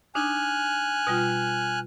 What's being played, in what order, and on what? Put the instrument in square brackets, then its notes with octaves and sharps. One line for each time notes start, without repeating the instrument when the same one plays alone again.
[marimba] D4 D#4 [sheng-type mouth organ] G#5 F6 F#6
[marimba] B2 G3 F4